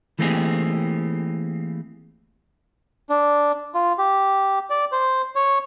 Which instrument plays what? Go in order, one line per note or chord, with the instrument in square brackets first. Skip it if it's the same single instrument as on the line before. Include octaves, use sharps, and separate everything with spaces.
[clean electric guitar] E3 A3 A#3 C4 G4 G#4
[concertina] D4
F4
G4
D5
C5
C#5